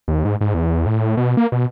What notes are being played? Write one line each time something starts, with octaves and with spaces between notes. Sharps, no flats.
D#2
G#2
G#2
E2
A2
B2
A#3
B2